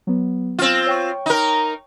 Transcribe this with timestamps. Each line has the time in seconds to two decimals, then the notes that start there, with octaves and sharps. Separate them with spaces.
0.07 F#3 B3
0.59 C4 F4 F6
0.87 C#5 G5 C#6
1.26 D#4 A#4